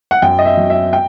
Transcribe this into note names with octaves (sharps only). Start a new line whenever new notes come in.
F#5
F#2 G5
D#5
E5
F#3
E5
G5